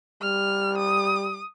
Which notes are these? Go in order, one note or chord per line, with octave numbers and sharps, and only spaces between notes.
G3 F6
D#6